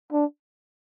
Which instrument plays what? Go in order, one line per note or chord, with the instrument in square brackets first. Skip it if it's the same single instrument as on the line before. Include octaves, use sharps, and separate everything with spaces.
[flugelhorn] D4